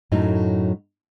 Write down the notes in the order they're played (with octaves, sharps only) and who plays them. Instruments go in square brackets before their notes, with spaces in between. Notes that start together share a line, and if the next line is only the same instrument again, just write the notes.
[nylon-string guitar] F#2 A2 F#3 A3 D#4